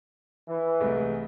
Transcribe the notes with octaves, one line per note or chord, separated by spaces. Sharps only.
E3
C2 G#3 A3